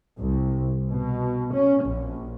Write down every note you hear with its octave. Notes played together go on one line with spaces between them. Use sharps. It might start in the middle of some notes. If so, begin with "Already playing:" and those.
C2
B2
C#4
A#1